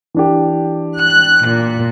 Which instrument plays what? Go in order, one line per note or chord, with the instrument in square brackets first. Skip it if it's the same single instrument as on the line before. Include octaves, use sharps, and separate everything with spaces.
[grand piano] E3 D4 G4
[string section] F#6
A#2